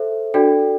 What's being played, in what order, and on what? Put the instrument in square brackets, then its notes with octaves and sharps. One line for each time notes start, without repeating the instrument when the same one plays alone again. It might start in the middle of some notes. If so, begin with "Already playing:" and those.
Already playing: [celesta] A4 C5 E5
D4 F#4 A4 D5 G5